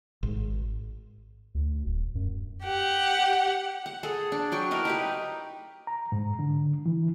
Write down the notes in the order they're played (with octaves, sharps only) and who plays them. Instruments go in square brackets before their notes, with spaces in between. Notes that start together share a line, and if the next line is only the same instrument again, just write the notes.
[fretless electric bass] G#1
[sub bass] D2
D1
F#2
[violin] G4 F#5
[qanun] F#5
G#4 A4
D4
F#3 G5 C#6
E4 A#4 B4 D#5
D#4 G4 B4
[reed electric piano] A#5
G#2
D3
E3